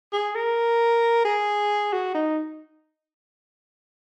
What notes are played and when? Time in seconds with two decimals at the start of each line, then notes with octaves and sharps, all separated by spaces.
0.13 G#4
0.35 A#4
1.25 G#4
1.93 F#4
2.14 D#4